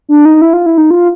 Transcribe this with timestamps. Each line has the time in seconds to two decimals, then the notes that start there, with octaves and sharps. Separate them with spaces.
0.09 D4
0.25 D#4
0.42 E4
0.53 F4
0.66 E4
0.78 D#4
0.91 F4